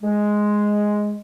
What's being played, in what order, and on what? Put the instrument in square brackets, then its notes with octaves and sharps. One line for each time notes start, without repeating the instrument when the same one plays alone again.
[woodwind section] G#3